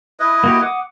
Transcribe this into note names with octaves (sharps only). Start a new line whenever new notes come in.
E4 B4 D#5
A#3 F#4 G4
F#5 D6 D#6